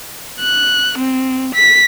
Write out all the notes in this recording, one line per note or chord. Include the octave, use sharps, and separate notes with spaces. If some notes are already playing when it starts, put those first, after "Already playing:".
F#6
C4
B6